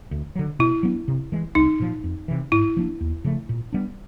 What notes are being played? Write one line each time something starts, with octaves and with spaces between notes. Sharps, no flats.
D2
D3 F#3
B2 E4
F#3 B3 D4
C3
E3 G#3
C2 D#4
A#2 F3
F2
C3 E3
G#2 E4
F3 A#3 D4
D#2
C#3 F3 A3
A#2
G3 B3 D4